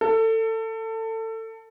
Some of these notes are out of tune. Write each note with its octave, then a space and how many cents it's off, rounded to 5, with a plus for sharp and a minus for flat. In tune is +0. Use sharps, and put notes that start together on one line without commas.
A4 +25